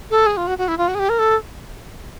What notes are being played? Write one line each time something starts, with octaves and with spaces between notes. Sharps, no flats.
A4
G#4
F4
F#4
F#4
E4
F4
F#4
G#4
G4
A#4
A4